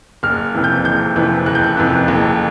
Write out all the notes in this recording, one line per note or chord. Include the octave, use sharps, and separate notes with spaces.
F#1 F6
F2 C3 E3
G6
F#1 G6
F2 C3 E3
F#1 F#6
G6
F#6
F2 C3 E3
F#1